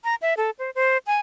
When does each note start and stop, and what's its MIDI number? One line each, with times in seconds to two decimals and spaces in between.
0.04 0.15 82
0.22 0.34 76
0.37 0.50 69
0.59 0.70 72
0.75 0.98 72
1.07 1.20 80